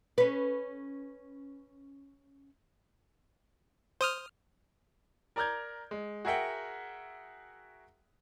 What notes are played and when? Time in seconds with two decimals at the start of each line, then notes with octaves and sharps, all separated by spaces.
0.18 C#4 B4
4.01 C5 D#6 F6
5.36 A#4 D5 A#5 F6 G6 G#6
5.91 G#3
6.25 F#4 G#4 A#4 E5 F#5 G5